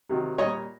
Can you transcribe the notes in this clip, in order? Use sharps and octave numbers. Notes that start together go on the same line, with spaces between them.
C3 D#3 F#3
A#2 G3 C#5 D#5